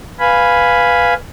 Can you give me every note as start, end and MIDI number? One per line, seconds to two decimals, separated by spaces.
0.19 1.14 71
0.19 1.14 77
0.19 1.14 80
0.19 1.14 83